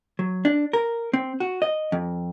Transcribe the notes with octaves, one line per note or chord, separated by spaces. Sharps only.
F#3
D4
A#4
C4
F#4
D#5
F2